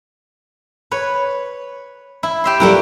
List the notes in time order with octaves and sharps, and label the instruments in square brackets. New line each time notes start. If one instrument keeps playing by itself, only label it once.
[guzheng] B4 C#5
E4
G4 E5 C6
[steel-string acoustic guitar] G3 E4 G4 [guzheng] A3 A#3 B4